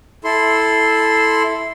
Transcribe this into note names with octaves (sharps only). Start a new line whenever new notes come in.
E4 A4 C6